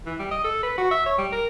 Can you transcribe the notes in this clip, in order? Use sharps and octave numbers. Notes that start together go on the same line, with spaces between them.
E3
G3
D#5
A4
B4
F#4
E5
C#5
G3
A#4